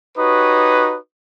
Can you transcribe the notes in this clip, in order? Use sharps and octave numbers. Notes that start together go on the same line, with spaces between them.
D#4 F#4 G4 B4 C#5 D#6